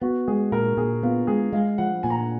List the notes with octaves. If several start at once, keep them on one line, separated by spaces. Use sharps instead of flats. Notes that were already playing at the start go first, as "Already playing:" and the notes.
B3 F#4
G#3 G#4
A#2 A#4
A#2 G#4
B3 F4
G#3 G#4
G#3 F5
F3 F#5
A#2 G#5
A#5
G#5